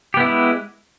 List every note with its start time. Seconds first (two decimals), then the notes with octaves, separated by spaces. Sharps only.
0.14 G4
0.17 B3
0.20 E4
0.23 G#3